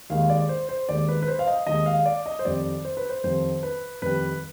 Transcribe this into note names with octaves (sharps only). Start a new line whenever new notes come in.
D#2 D#3 G#3 F5
D5
C5
C5
D#2 D#3 G#3 D5
B4
B4
C5
F5
D#5
D#2 D#3 G#3 D#5
F5
D5
D#5
C5
F2 D#3 G3 D5
C5
B4
C5
F2 D#3 G3 C5
B4
F2 D#3 G3 B4